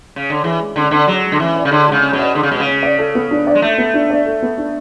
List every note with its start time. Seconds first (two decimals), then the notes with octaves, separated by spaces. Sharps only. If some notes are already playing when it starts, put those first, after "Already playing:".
0.16 C#3
0.30 D3
0.44 E3 G#4
0.59 G#3
0.76 D3 C#4
0.91 D3 D5
1.07 F#3 G#4
1.24 G#3
1.32 D3
1.39 E3 C#4
1.56 D5
1.65 C#3
1.71 D3 G#4
1.88 C#3 G#3
2.03 C#4
2.13 B2
2.19 D5
2.34 D3 G#4
2.43 C#3
2.51 B2 G#3
2.60 C#3
2.67 C#4
2.83 D5
2.98 A4
3.15 B3
3.31 D4
3.47 D5
3.55 G#3
3.62 A3 A4
3.78 B3
3.94 D4
4.10 D5
4.26 A4
4.43 B3
4.58 D4